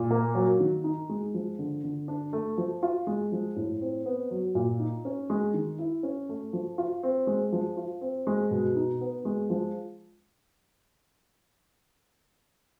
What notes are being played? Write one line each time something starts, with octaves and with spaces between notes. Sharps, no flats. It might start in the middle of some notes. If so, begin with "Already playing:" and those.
Already playing: A#2
A#3
F#3
D#3
D#4
G#3
F3
D3
D3
D4
A3
F3
F4
G#3
F3
A2
C4
B3
F#3
A#2
D#4
C#4
G#3
D#3
E4
C#4
A3
F3
F4
C4
G#3
F3
F4
C4
G#3
B2
D#4
B3
G#3
F3